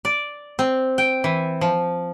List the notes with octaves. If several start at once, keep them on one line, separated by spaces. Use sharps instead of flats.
D5
C4
G5
E3
F3